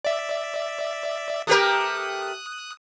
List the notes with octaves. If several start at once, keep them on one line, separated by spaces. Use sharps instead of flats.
D5 E5
A3 G4 A#4 D#6 F#6